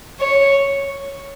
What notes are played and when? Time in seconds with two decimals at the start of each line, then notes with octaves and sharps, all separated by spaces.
0.20 C#5